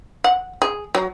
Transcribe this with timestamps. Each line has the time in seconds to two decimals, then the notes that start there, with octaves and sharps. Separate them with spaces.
0.24 F#5
0.62 G#4
0.95 F#3